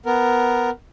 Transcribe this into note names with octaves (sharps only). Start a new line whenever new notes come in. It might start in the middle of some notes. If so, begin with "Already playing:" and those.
B3 A#4